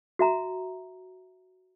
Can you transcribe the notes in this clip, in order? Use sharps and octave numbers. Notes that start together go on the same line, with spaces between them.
F#4 E5 A#5